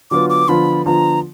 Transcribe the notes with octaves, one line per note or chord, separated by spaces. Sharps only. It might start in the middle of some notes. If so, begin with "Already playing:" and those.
D3 F#3 B3 F4 D6
D6
D3 F3 B3 F4 B5
D3 F3 B3 F4 A#5